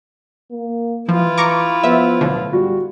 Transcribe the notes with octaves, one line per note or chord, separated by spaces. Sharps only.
A#3
E3 F3 E4 F4
A#5 C#6 D6
F3 B3 E5
B1 A2 D3
G3 F#4